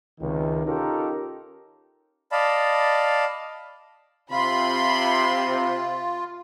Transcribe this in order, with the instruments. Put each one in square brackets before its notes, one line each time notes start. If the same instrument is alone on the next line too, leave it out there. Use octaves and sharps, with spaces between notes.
[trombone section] C#2 C3 D#3
C#4 D#4 F4 G4 A4 A#4
[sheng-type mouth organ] D5 D#5 F5 A5 B5
[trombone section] C3 [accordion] F4 [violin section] B5 C6